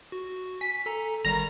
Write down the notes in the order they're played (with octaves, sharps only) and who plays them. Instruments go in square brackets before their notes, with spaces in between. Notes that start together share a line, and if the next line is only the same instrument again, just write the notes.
[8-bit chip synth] F#4
[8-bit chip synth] G#5 [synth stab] B6
[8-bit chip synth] A4 G#5 A#5
[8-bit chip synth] G1 D#3 G3 [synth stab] A#5